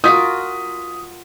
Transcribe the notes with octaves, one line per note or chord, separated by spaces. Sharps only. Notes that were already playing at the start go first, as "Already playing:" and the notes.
F4 F#4 A#4 D#6 B6